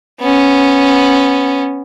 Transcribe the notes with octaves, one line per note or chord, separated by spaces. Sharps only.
B3 C#4